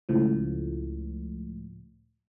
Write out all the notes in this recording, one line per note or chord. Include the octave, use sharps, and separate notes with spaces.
C#2 A2 F3